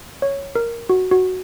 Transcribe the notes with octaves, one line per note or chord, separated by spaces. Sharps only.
C#5
A#4
F#4
F#4